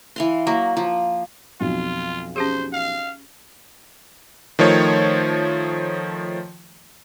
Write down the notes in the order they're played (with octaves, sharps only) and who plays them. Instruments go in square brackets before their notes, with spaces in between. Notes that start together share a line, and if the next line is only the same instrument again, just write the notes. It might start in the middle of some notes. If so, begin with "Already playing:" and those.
[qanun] E3 F5 C6
F#3 A#3
F3
[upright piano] B1 F2 [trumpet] F4
[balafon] C#4 G4 G#4 [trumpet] C5
[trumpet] F5
[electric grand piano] D#3 F3 A3 C#5